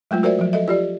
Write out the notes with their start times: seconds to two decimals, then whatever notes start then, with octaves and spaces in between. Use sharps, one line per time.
0.11 F#3 G#3 A3 F4
0.23 F#4 A#4 C5 D5 E5
0.39 F3 F#3
0.53 A4 D#5 E5
0.68 F4 G4 D5